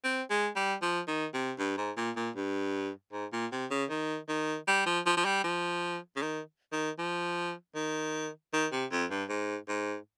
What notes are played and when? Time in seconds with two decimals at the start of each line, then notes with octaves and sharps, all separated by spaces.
0.04 C4
0.30 G#3
0.56 G3
0.82 F3
1.08 D#3
1.33 C3
1.59 G2
1.77 G#2
1.97 A#2
2.16 A#2
2.36 G2
3.12 G#2
3.32 A#2
3.52 C3
3.71 C#3
3.90 D#3
4.29 D#3
4.67 G3
4.86 F3
5.06 F3
5.17 F3
5.25 G3
5.44 F3
6.16 C#3
6.22 D#3
6.72 D#3
6.99 F3
7.75 D#3
8.53 D#3
8.72 C3
8.91 F2
9.11 G2
9.29 G#2
9.69 G#2